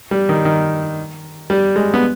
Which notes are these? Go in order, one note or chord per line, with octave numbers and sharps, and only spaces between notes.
G3
D#3
D#3
G3
G#3
B3